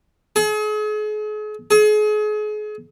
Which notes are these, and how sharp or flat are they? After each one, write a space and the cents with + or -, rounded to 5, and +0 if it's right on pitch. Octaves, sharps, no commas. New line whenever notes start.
G#4 +40
G#4 +35